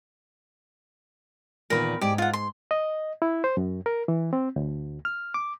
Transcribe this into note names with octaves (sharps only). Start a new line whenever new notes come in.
E2 A#2 D#3 A#4 B5
G#2 G4 D5
F4 F#5
C6
D#5
E4
C5
F#2
A#4
E3
C4
D2
F6
D6